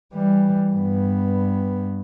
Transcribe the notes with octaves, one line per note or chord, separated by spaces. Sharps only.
E3 G3
G2 B3